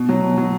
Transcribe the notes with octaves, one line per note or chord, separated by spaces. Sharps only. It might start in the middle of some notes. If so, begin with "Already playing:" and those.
Already playing: B2
F#3
B2
F#3